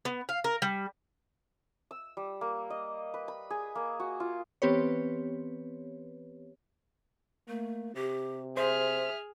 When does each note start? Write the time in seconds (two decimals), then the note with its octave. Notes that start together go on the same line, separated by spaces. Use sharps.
0.05 B3
0.29 F5
0.44 A#4
0.62 G3
1.91 E6
2.17 G3
2.41 A#3
2.70 D#5
3.14 B4
3.28 B5
3.50 G#4
3.75 A#3
4.00 F#4
4.20 F4
4.62 E3 B3 C4 G4 B4 C#5
7.48 A3 A#3
7.95 C3 G4
8.57 G#4 C5 E5 F6